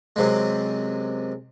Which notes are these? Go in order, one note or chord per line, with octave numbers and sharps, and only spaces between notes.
F#2 C3 G#3